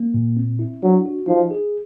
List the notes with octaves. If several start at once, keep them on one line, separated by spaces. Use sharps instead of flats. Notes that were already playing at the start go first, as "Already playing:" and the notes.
Already playing: A#3
A#2
C4
E4
F#3 D4
F#4
F3 D#4
G#4